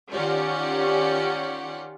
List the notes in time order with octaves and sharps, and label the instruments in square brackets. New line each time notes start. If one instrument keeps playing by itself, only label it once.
[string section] D#3 C#4 F4 G4 D5 F#5